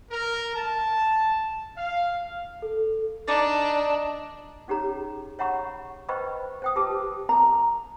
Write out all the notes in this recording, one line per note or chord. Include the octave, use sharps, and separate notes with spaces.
A#4
A5
F5
A4
D4 D#4 D5
C#4 D#4 G4 G#4 C#5 A#5
C#5 E5 F#5 A#5 B5 C#6
B4 C5 D#5 G5 B5 C#6
C5 G5 D#6
F4 G4 B4 A5 D6
A#5